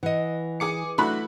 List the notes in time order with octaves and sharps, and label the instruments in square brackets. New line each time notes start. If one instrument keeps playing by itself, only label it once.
[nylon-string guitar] E3 [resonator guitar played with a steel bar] D#5 F#5
[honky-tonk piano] G#4 D6 C#7
[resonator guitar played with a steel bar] F#3 D4 F#4 [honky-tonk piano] A3 E4 B5